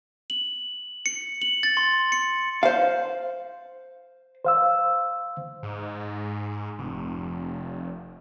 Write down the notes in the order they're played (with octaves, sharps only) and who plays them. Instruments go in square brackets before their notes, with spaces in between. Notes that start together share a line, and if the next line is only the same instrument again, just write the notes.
[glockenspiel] F#7
C#7
F#7
A6
C6
C#7
[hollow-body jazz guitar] C5 F5
[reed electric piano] C5 F5 E6
[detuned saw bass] G#2
F1